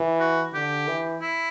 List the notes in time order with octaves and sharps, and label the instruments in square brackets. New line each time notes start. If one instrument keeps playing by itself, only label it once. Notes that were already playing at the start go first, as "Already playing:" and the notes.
Already playing: [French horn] E3
[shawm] F#4
[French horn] D3 [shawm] G4
[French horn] E3
[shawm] E4